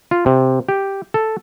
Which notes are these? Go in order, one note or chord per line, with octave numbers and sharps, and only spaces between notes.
F4
C3
G4
A4